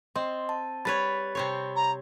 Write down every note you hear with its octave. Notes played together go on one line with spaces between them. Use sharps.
C4 D#5 C6
A5
G3 B4 C#5 B5 A6
C3 C4 C#5
A#5